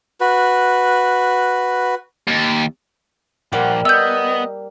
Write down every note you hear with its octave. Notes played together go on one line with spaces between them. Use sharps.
F#4 B4
D#2
A#2 F3 G3 A#3 F#5
B3 D#5 E6 G6